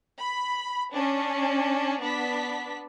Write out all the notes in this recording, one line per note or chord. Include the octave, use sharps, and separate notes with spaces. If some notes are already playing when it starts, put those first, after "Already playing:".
B5
C#4 D4
B3 D4 B6